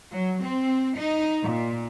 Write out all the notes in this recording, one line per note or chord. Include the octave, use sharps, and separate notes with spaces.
F#3
C4
D#4
A#2